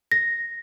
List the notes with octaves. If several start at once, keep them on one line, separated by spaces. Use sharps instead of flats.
A#6